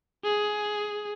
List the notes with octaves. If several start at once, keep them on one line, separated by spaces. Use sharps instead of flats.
G#4